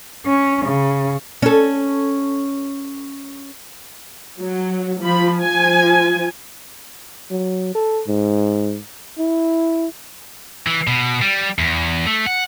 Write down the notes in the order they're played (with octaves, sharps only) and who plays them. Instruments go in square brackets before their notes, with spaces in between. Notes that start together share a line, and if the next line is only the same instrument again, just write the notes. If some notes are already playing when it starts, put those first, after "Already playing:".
[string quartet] C#4
C#3
[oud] C#4 A4
[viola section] F#3
F3 B5
F3 G#5
[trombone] F#3
A4
G#2
E4
[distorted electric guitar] E3
B2
G3
E2
A3
F#5